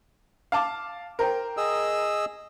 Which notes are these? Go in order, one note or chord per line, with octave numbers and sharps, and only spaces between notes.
F5 A5 D6
A#4 C5 G5
G#4 D#5 E6